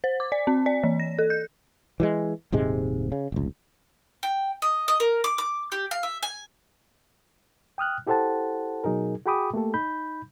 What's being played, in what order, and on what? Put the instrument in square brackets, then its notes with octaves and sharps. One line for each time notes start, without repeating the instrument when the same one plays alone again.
[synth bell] C5
D6
D5
C4
D5
E3
A#6
A4
G6
[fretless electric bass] E3 F#3 G#3
D#1 G#2 C3 G#3
C#3
F1 C#2
[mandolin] G5
D#5
D#5
A#4
D6
D6
G4
F5
E5
G#5
[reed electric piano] G5 D#6 F6 F#6
E4 G4 A4 C5 F#5 A5
B2 F#3 D#4 G#4 A#4
F#4 G#4 G5 B5 D6 D#6
A3 A#3 G4 A4
D#4 B5 G6